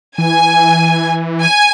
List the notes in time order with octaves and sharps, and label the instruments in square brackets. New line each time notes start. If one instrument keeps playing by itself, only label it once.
[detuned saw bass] E3 [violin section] G#5
[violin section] G#5